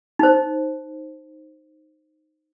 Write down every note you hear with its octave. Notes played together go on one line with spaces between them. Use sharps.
D#4 C5